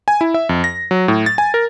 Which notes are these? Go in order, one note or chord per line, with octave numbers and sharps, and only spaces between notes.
G#5
E4
E5
F2
A#6
F#3
A2
A6
G#5
A#4